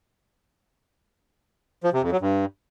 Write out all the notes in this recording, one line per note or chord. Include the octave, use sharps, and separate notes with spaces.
F3
C3
F2
F#3
G2